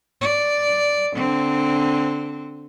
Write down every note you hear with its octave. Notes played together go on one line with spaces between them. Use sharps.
D5
D3 C4